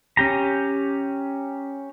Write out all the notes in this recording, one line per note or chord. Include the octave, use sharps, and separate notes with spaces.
C#4 G4 A#5